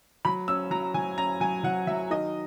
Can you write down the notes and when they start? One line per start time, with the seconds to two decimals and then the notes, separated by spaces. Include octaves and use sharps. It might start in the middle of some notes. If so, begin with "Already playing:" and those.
0.25 F#3 B5
0.48 C#4 E6
0.71 F#3 A#5
0.94 F#3 G#5
1.18 C#4 A#5
1.41 F#3 G#5
1.64 F#3 F#5
1.87 F#3 E5
2.10 D#3 D#5